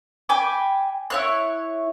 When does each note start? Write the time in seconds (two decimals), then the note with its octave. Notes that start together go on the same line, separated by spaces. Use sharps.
0.29 G5 G#5 B5 D6
1.10 E4 C#5 F#6